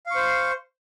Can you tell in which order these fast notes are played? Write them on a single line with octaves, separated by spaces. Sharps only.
F5 C#6 C5